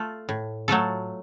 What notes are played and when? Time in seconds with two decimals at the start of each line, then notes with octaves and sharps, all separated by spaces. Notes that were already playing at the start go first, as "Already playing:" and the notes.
Already playing: A3 F4 A4
0.29 A2
0.68 F#3 A3 F4 A4